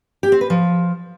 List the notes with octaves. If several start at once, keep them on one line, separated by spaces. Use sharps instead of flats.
G4
C4
B4
F3